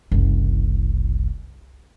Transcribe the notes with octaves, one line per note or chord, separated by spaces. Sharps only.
F#1 C2